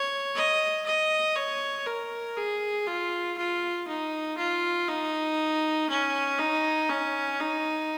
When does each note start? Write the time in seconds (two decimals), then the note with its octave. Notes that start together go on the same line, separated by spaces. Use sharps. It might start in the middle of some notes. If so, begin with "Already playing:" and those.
Already playing: C#5
0.35 D#5
0.86 D#5
1.36 C#5
1.86 A#4
2.37 G#4
2.87 F4
3.38 F4
3.87 D#4
4.38 F4
4.89 D#4
5.89 C#4
6.39 D#4
6.89 C#4
7.40 D#4